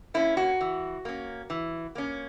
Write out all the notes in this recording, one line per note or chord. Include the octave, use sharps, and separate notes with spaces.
A#3 C#4 E4
F#4
E3
A#3 C#4
E3
A#3 C#4